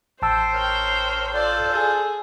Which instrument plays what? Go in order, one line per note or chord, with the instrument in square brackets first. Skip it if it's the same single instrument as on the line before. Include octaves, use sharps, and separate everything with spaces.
[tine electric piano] A1 A5 E6 [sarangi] C5 [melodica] G5
[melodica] A#4 [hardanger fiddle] C#5 G5
[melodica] F4 C5 [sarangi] A4 [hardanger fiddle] D5
[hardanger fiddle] G#4